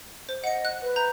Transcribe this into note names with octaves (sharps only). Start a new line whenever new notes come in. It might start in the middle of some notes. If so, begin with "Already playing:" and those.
C5
D#5 F#5 C#7
F#6
B4
A#5 G6